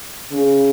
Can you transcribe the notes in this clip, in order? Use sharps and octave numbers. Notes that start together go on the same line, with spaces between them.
C#3